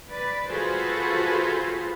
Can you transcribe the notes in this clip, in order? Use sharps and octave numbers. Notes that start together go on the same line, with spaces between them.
B4 D5
F4 F#4 G#4 A4 B4 C5